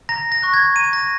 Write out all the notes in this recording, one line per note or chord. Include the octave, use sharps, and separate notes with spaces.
A#5 A#6
A#6
C#6 F#6
G#6
A#5 D#7
A#6